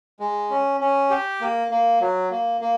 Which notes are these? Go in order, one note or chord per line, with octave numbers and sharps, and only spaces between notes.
G#3
C#4
C#4
G4
A#3
A#3
F#3
A#3
A#3